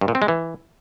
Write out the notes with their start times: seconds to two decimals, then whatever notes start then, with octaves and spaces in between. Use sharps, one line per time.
0.01 G2
0.08 A#2
0.15 C4
0.22 G#3
0.28 E3